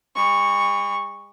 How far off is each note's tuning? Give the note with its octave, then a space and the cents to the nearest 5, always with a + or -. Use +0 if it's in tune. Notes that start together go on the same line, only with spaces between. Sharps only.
G#3 -45 C#6 +0